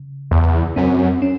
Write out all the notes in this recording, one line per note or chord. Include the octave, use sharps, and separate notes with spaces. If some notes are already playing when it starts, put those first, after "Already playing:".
Already playing: C#3
E2
F#2 C4
C#4